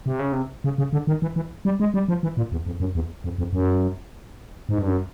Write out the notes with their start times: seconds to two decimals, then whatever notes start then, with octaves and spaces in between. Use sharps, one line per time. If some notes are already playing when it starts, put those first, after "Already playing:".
0.06 C3
0.19 C#3
0.32 C3
0.64 C#3
0.78 C#3
0.93 D3
1.07 D#3
1.22 E3
1.36 E3
1.65 G3
1.80 G#3
1.94 G3
2.08 F3
2.23 E3
2.37 A#2
2.52 E2
2.66 F2
2.80 F#2
2.95 E2
3.24 F2
3.38 F2
3.53 F#2
4.69 G#2
4.78 G2
4.87 F#2